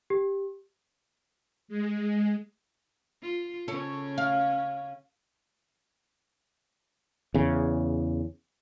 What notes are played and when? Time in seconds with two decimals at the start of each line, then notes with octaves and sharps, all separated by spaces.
0.10 G4
1.68 G#3
3.22 F4
3.68 C#3 C#4 A4 C#5
4.18 F5
7.34 E2 C#3